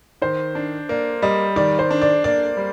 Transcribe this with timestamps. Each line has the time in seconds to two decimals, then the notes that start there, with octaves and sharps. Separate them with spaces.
0.22 D#3 C5
0.55 D4
0.89 A#3 D5
1.22 G3 D#5
1.56 D#3 D5
1.79 C5
1.91 D4
2.02 D5
2.24 A#3 D5
2.57 G3